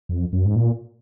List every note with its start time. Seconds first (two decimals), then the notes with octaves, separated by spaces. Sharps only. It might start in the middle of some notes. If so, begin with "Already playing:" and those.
0.09 F2
0.33 F#2
0.45 G#2
0.56 A#2